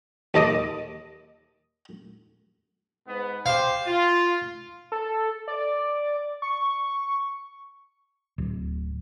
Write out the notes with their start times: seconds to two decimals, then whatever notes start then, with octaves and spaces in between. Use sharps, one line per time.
0.34 D#2 A4 D#5 D6 D#6
3.07 G#2 B3
3.46 G4 C5 F5
3.86 F4
4.92 A4
5.48 D5
6.42 C#6
8.38 D1